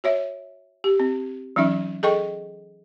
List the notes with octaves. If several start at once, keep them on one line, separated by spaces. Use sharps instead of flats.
F#4 C#5 E5
G4
C4
E3 F#3 C#4 D#4 E5
G#4 A4 D#5 G5 C#6